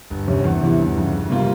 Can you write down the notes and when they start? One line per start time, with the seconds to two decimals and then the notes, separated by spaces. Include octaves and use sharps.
0.10 G1
0.28 F2 C3 G3 C#4
0.44 E2
0.62 C3 E3
0.78 G1
0.95 F2 C#3
1.13 F2
1.30 C3 G3 A#3 F4